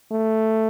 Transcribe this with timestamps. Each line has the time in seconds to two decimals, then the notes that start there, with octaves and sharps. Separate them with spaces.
0.12 A3